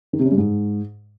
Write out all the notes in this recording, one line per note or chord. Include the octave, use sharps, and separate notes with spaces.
D#3
C3
C#3
G2
G#2